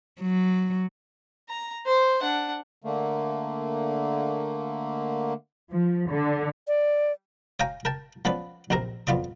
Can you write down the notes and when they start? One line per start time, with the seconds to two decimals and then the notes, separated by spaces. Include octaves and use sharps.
0.21 F#3
1.49 A#5
1.86 C5
2.22 D4 F#5
2.84 D3 A3 A#3
5.71 F3
6.09 D3
6.68 D5
7.60 C#5 F5 G5 G#5 A#5 C#6
7.85 A#4 G5 A5
8.25 F3 B3 C#4 B4 D5
8.70 A#1 C3 C4 A#4 A#5
9.07 F2 B3 F4 D5 C#6